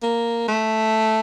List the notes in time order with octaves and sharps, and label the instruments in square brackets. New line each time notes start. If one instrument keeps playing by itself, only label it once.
[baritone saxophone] A#3
A3